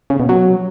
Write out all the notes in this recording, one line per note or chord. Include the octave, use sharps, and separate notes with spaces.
C#3
B2
F#3